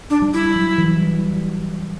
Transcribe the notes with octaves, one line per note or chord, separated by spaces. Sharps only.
D4
G3
E4
F#3
E3
G3